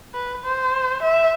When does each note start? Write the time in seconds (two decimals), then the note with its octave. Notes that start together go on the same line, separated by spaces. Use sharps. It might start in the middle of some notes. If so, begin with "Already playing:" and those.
0.14 B4
0.45 C5
1.02 E5